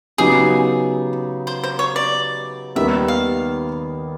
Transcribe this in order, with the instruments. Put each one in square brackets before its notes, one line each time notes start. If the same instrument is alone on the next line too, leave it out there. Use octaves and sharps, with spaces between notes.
[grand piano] C#3 F#3 B3 D#4 G4 [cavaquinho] G#4
[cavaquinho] C5
C5
C#5
D5
[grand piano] D#2 D#3 G3 B3 [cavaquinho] E5
[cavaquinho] F5